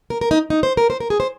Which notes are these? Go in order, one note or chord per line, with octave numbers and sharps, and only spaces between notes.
A#4
A#4
D#4
D#4
C5
A#4
C5
A#4
G#4
C5